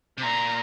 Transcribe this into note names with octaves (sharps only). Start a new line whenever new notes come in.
C3
A#2 A#5